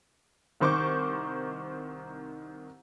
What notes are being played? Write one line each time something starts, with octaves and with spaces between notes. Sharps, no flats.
C2 D#3 C5 C#6 D6 G6